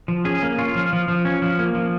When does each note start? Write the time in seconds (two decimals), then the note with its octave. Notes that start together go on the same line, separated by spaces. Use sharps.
0.08 F3
0.25 C#4 G#4
0.43 A#3
0.58 C#4 F4
0.75 F3
0.93 F3
1.08 F3
1.25 C#4
1.42 F3
1.59 A#3
1.75 F3